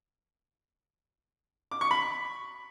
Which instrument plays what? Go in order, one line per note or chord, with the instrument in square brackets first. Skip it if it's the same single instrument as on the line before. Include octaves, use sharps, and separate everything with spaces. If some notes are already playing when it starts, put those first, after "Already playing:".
[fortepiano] D6
C#6
B5